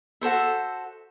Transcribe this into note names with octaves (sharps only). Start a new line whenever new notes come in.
F#4 A4 C5 E5